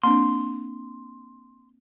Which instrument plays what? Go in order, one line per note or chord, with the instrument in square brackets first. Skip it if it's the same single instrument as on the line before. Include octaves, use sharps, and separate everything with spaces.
[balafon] A#3 C4 D4 [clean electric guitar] C6